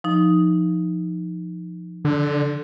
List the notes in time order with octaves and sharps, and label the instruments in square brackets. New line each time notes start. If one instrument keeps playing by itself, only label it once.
[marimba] F3 D#4
[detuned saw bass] D3